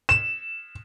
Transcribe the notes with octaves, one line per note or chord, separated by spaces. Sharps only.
E7